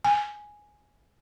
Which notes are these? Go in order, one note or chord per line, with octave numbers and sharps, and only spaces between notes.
G#5